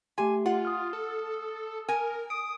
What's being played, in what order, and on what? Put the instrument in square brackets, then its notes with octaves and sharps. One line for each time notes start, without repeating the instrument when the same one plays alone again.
[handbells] A3 G4 C6 [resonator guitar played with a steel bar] G#5
[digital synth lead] F4 [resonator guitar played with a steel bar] F#5
[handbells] D#6 F6
[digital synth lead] A4
[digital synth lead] A#4 [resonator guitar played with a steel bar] G#5
[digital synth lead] D#6 [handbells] D7